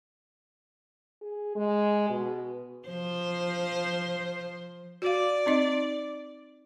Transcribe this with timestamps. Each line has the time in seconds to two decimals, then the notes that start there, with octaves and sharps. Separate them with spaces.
1.22 G#4
1.55 G#3
2.09 B2
2.88 F3 C5
5.02 F#4 D5 F5
5.46 C4 D#4 D#5